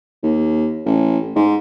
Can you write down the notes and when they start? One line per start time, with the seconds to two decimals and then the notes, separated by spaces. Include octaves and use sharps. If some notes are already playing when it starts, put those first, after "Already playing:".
0.23 D#2
0.85 A1
1.35 G#2